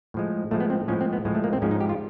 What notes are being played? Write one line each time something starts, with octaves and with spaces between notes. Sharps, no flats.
A2 F3 G#3
A2 F3 G#3 A3
B3
C4
A2 F3 G#3 C#4
C4
B3
A2 F3 G#3
A3
A#3
C4
G#2 F3 G#3 C#4
D#4
G4
F4